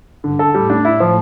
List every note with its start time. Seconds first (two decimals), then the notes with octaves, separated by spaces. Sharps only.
0.24 G2 D3
0.39 A4
0.54 A2 G3
0.70 D4
0.85 E4
1.00 F3